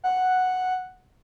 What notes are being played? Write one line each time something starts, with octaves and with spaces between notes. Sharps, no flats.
F#5